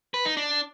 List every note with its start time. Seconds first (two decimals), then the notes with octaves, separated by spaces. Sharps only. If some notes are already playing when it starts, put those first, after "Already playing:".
0.14 B4
0.25 D#4
0.37 D4